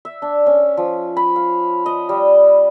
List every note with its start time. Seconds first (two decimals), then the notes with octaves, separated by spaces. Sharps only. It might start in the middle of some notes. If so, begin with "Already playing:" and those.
0.05 E5
0.22 D4
0.46 C#4
0.77 F3
1.17 B5
1.36 F5
1.86 D#5
2.09 G3